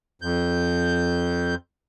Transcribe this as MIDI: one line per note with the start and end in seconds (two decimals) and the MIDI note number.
0.22 1.55 41
0.22 1.55 91